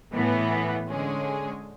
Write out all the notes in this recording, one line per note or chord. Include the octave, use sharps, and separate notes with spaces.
A2 E3 B3
D3 G#3 C#4 G#4